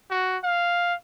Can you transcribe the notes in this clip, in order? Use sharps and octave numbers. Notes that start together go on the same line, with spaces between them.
F#4
F5